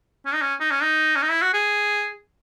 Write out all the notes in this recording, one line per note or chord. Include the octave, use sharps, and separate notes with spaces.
C#4
D#4
C#4
D#4
C#4
D#4
C#4
D#4
E4
F#4
G#4